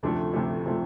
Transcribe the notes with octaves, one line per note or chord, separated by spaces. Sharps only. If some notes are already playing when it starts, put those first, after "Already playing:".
D2 C3 F3 A3 D4
D2 C3 F3 A3
C3 F3 A3